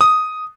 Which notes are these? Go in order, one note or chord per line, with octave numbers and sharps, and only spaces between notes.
D#6